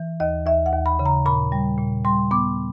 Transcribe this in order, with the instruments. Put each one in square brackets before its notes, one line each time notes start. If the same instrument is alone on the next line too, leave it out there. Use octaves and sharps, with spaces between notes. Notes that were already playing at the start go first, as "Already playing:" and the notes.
Already playing: [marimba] E3
D#2 D#5
D#2 E5
F#5
D#2
B5
C#3
A#5
A#2 B5
G3
A#2
G3 C6
B3 D6